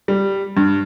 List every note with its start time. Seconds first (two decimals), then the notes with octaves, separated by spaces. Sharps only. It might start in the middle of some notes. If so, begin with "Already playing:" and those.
0.08 G3
0.57 G2